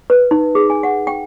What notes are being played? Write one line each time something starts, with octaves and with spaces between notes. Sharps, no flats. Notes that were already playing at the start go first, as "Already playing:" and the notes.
B4
D#4
G#4
G#5
F#5
G5